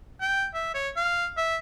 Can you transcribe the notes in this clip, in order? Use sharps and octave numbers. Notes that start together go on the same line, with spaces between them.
G5
E5
C#5
F5
E5